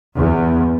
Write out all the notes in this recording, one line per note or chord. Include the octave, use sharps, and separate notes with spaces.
E2